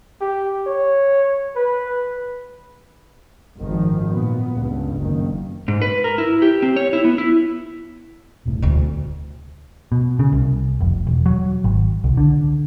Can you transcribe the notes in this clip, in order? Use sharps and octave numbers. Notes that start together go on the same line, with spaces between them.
G4
C#5
B4
G#1 F#2 D#3 F3
A#2 B3
C#2 G2
F#1 D#3
G#2
B4
A#4
E4
G4
C4
C#5
E4
B3
E4
E1 C2 A2
D2 D4
B2
C#3
C2
F1
E1
F#3
G#1
C2
D3